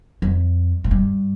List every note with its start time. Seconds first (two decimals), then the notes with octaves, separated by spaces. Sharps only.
0.22 F2
0.84 A2
0.91 G2